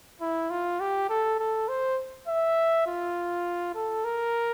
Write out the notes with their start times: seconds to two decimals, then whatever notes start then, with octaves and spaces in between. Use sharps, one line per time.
0.21 E4
0.50 F4
0.80 G4
1.10 A4
1.39 A4
1.68 C5
2.28 E5
2.87 F4
3.75 A4
4.04 A#4